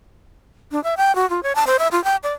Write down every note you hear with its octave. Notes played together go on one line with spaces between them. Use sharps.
D4
E5
G5
F#4
F4
C#5
A5
C5
E5
F4
G5
D5